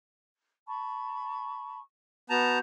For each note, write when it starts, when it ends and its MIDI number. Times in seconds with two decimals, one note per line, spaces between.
0.67 1.79 81
0.67 1.79 83
0.67 1.79 85
2.30 2.59 59
2.30 2.59 66
2.30 2.59 81
2.30 2.59 82
2.30 2.59 91